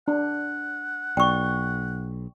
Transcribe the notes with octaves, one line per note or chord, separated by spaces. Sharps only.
D4 F#5
B1 D5 G5 C#6